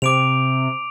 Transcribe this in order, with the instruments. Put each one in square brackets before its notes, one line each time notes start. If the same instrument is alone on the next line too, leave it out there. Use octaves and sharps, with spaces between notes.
[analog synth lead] C3 [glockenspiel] D6 D7 F7